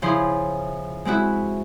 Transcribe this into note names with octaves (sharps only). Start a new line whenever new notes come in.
C#3 F3 E4 C6
G#3 C4 E4 F#4